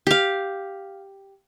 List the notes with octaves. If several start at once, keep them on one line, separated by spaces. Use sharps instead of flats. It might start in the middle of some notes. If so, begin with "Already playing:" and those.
G4 F5